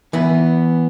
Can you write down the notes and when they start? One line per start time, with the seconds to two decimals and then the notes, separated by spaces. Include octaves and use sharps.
0.13 E3 B3 B4